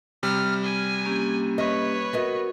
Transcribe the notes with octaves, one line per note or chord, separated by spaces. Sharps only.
C3 G3 F6
G#5
A#3 C#4 G4
B4 C#5 D#5
B3 F#4 A#4 D#5